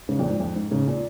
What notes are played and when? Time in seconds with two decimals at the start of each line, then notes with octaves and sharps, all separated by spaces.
0.09 G#2 C#3
0.19 F2 A#2
0.30 G#2
0.40 F2
0.56 G#2
0.71 G#2 C#3
0.87 A#2